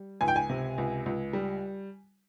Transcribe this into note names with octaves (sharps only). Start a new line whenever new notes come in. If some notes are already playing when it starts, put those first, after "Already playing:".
Already playing: G3
C#2 G#5
G5
G#5
C3
C#2
C#2
G3